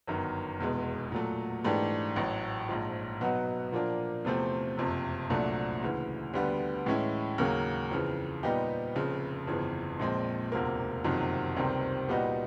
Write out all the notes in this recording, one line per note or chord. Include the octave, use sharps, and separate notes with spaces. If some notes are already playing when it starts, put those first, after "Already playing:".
G1 F#2 D#3
F1 E2 B2 G#3
A#2 F#3 A3
G#2 E3 A3 D4 G4
A1 A2 F#3
A#1 G#2 F3
B2 F#3 B3 D#4 F#4
A#2 F3 A#3 D4
E2 C3 F3 A3 C4
F#1 F2 C3
C2 A#2 F#3 A3 D4
D2 C#3 E3
D2 D3 G3 B3
A2 E3 G#3 C#4 E4
D#2 C#3 F#3 A#3 C#4
F2 C#3 E3
A#2 G3 B3 D#4 G4
F1 F2 C#3
G1 F2 C#3 E3
A#1 A#2 F3 G#3 C4
E1 D2 C3 F3 A#3
F#1 F2 C3 D#3 F#3
C#2 C3 D#3 G3 C4
A#2 G3 B3 D#4 F#4